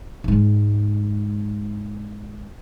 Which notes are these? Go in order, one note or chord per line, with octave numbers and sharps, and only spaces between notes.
G#2 G#3